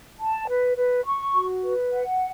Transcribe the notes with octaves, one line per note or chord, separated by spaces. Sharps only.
A5
B4
B4
C#6
F#4
B4
F#5